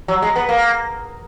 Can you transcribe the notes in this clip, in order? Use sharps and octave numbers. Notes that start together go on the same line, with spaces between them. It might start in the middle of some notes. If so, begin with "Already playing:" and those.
F#3
G#3
B3
A#3